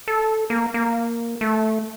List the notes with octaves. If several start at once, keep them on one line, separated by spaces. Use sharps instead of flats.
A4
A#3
A#3
A3